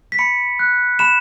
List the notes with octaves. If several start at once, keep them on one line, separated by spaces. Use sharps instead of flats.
B6
B5 C#7
F#6
B5 E7